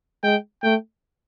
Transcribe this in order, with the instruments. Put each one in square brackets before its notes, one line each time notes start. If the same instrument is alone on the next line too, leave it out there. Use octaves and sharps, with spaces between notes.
[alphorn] G#3 [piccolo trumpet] G5
[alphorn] A3 [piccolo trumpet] G5